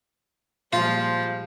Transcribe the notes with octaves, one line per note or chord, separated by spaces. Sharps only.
A#2 F3 G3 G#3 F4 C5